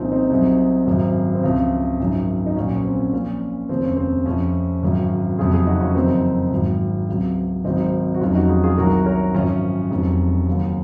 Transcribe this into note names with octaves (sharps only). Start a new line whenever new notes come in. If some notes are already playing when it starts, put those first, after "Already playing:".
Already playing: C2 A#2 F3 C4 C#4 D#4 F4
C4 D#4
C2 C3 F#3
G#1 F#2 C#3
C4
C#2 C3 F3 C#4
G#1 F#2 D#3
D#4
A#1 A#2 F#3 C#4
C#4
C4
C#4
A#1 A#2 F3 C#4
F1 D#2 C#3 F3 C4
C#4
C4
F2 C3 F3 C#4
G#1 F#2 C#3 F#3
F#1 F2 C3 F#3 F4 G#4
F4 G#4
D#4 F#4
C#4 F4
F#1 F2 D#3 F#3 C4 D#4
G#1 G#2 F#3
C#2 C3 F#3
G#1 G#2 D#3 F#3 C4 D#4
F#4
F1 F2 D#3 F#3 C#4 F4
D#4 F#4
F4 G#4
F4 G#4
C2 C3 D#3 F#3 F#4 A#4
A#4 C#5
G#1 F#2 F3 C#4 F4
F1 F2 D#3 F#3
D#2 C#3 F#3